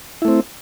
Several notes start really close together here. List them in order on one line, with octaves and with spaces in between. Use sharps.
E4 A3 C4